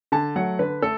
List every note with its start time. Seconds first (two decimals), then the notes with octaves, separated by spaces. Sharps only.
0.12 D3 A5
0.36 F#3 A3 F#5
0.59 D3 B4
0.82 A3 A4